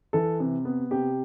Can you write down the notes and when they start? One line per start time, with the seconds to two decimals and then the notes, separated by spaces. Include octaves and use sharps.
0.13 E3 A4
0.40 C3
0.65 B3
0.91 C3 G4